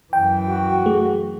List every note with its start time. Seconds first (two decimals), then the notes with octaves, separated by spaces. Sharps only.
0.13 F#2 E3 G5
0.49 F#4
0.86 A3 G#4